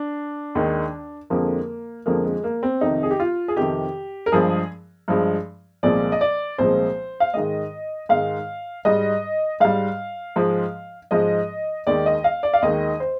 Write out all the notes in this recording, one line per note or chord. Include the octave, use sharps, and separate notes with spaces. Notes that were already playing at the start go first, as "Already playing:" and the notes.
Already playing: D4
D#2 D#3 G#3
F2 D3 F3 G#3 A#3
F2 D3 F3 G#3 A#3
G#3
A#3
C4
F2 C3 D#3 D#4
G#4
G4
F4
G#4
F2 C3 D#3 G4
A#4
G2 F3 G#3 G#4
G2 F3 G#3
C2 A#2 F3 G#3 D5
D#5
D5
C2 A#2 F3 G#3 C5
F5
G#2 D#3 G#3 D#5
G#2 D#3 G#3 F5
G#2 G3 D#5
G#2 G3 F5
G#2 F3 G#3
G#2 F3 G#3 D#5
D#2 D#3 G#3 D5
D#5
F5
D5
F5
D#2 D#3 G#3 D#5
C5